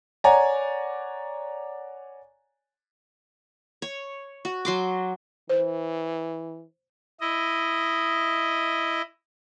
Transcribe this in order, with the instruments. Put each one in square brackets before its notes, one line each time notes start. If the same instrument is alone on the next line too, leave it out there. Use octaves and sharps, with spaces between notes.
[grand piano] C#5 D5 F#5 G#5 A#5
[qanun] C#5
F#4
F#3 C6 D6
[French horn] E3 [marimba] C5
[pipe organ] E4 D#5